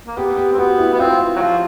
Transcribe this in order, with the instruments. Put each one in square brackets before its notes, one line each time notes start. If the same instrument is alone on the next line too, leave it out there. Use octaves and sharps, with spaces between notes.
[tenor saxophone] A#3
[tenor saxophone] B3 [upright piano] G4
[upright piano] G4
[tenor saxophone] C4
[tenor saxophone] B3 [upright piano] F#4
[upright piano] E4
[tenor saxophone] B3
[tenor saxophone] C4 [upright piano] F4
[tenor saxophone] F#3
F3